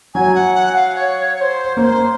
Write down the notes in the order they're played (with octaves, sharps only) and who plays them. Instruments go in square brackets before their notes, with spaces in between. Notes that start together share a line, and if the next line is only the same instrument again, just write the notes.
[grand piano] F#3 [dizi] G#5
[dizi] F#5
F#5
F5
C#5
C#5
C5
[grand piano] A#3 [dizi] C#5
[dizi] C5